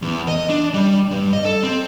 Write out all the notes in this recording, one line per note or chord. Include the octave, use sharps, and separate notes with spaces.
E2
D#5
D4
G3
G2
D#5
A4
C4